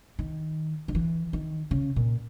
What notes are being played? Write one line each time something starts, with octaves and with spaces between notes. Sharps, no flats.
D#3
D#3
E3
D#3
C#3
A#2